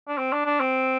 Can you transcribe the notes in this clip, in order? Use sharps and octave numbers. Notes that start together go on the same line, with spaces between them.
D4
C4
D4
D4
C4